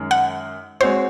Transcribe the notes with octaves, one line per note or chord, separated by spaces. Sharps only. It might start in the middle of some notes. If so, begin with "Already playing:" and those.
Already playing: F#2 D#3 G#3 C#4
F#5
G#3 C4 F#4 C5 C#5